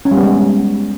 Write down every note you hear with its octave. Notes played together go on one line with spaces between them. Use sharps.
C#4
G3
B3
G#3